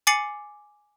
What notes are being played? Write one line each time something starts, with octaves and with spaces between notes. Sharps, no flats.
G#5 D6 A6 C7 C#7 F#7